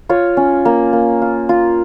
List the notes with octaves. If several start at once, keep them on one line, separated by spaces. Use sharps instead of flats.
F4 C#5
C#4
A#3
A#3
F4
F4